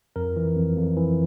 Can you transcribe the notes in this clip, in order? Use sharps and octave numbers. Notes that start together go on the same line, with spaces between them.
F2 A#4
E3
F2
F2
E3